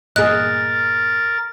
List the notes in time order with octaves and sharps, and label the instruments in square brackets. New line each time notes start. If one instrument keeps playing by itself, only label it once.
[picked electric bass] G1 A#2 [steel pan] G#4 D#5 [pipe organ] A#4 A6 [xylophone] F#6